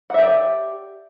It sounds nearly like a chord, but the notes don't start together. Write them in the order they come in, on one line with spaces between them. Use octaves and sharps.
F#5 E5 G4 D5